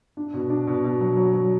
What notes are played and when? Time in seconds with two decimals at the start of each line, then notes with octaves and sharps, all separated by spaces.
0.17 D4
0.34 B2
0.50 D4
0.67 B2
0.84 B2
1.01 F#3
1.17 F#3
1.34 F#3